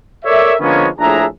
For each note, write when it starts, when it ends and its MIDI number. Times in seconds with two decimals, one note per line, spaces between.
0.24 0.54 69
0.24 0.54 70
0.24 0.54 73
0.24 0.54 74
0.24 0.54 76
0.60 0.88 50
0.60 0.88 53
0.60 0.88 56
0.60 0.88 58
0.60 0.88 59
0.60 0.88 61
0.99 1.24 34
0.99 1.24 45
0.99 1.24 62
0.99 1.24 68
0.99 1.24 76
0.99 1.24 82